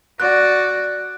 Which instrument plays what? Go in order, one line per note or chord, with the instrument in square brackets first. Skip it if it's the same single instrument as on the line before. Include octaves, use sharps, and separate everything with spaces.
[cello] F#4 D5 [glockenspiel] F#6